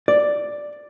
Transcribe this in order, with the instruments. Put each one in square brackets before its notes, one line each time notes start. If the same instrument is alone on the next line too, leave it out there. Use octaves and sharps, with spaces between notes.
[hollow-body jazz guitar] D5